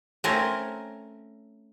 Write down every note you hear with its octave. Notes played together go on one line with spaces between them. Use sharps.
A3 C4 C#4 A#4